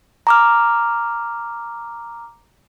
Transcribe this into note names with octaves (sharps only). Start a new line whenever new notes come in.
A#5 D6 F6